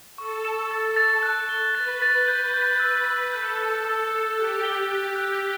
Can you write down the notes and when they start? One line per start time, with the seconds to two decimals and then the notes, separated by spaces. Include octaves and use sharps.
0.18 A4 C#6
0.45 E7
0.71 A6
0.96 A6
1.23 F#6
1.49 G7
1.75 B4 A6
2.02 A6
2.28 B4 G6
2.54 G6
2.80 E6
3.06 E6
3.32 A4 G6
3.58 G6
3.85 E6
4.11 E6
4.37 G4 F#6
4.63 G7
4.89 F#6
5.16 F#6